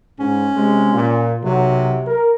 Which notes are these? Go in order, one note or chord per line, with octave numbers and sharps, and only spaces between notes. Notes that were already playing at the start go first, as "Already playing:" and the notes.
G#2 C#4
C3 G#3
A#2
B1 C3 F#3
A#4